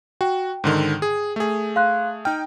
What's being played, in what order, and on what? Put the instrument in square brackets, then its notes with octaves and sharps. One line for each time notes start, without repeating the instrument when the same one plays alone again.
[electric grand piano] F#4 [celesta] G5
[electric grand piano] G#2 D3 D#3
G#4
A3 G#4
[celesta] F5 C6 F#6
[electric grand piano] D#4 G5 [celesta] F6